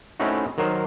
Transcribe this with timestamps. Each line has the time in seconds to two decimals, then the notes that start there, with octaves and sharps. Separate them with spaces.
0.20 A3 C4 C#4 D#4 E4 F#4
0.58 D#3 F#3 A#4 C5